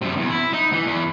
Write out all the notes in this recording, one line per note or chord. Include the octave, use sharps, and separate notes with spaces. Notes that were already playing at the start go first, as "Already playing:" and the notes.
F#2 C3
E2
E4
D#4
E3
E2